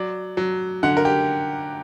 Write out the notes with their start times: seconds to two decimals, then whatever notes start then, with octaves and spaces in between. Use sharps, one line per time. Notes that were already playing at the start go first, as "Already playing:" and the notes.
Already playing: F#3 D5
0.37 F#3
0.83 D3 F#5
0.97 A#4
1.05 G4